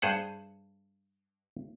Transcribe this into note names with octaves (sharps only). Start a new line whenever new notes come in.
G2 G#4 C5 F#5